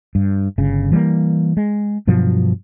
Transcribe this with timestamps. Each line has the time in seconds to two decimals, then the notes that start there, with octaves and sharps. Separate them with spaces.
0.15 G2
0.58 G1 C#3
0.92 E3 G3 G#3 A#3
1.57 G#3
2.07 G2 B2 F3 F#3